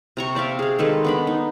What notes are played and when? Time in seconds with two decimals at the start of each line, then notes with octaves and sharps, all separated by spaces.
0.17 C3 A#5 C#6
0.35 C5 D5 E5 F5
0.59 G#4 F5
0.79 D#3 G#3 A4 B4
1.05 B3 D4 B5
1.27 D#4